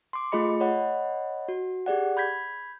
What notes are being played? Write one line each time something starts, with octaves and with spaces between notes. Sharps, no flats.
C6 D6
A3 F4 G#4 D#5 B5 C#7
C#5 D#5 F#5 B5
F#4
G4 G#4 D5 F#5
B5 G6 G#6 B6